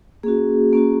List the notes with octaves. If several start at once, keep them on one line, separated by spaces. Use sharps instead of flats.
A#3 C#4 F#4 G#4
A#3 C#4 F#4